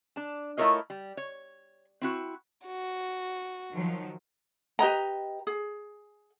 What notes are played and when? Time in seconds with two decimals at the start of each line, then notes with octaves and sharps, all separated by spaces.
0.16 D4 A5
0.58 A3 E4 F4 A#4 C#5 D#5
0.90 G3
1.17 C#5
2.01 C4 E4 F#4
2.66 F#4
3.71 D#3 F3 F#3
4.79 G4 B4 D#5 A#5
5.47 G#4